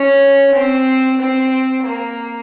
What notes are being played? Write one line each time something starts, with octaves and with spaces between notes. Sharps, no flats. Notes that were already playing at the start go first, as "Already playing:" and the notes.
Already playing: C#4
C4
C4
A#3